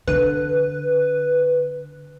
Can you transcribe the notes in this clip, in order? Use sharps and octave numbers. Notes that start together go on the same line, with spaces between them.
D3 B4